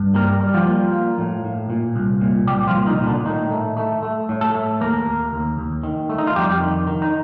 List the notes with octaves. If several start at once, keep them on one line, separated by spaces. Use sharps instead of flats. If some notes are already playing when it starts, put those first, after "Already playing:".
Already playing: G2
G3 A#3 A#4
G3
F3 F4
A#3
A#3
A2
A2
A#2
C2
A#2
C2 G3 G4
F3 F4
A#2
D#3 D#4
A#2
D3 D4
A2 D#3 D#4
A3
A3
A3
A2
A3 A4
A3
D#2 A#3 A#4
D#2
D#2
D#2
D#3
A3
D#4
F4
F2 G3 G4
D#3
D#3
D#4